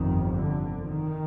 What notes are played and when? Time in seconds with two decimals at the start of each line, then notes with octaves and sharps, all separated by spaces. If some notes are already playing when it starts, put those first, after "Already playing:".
Already playing: G1 F2 C3 D#3
0.36 D3
0.89 D#3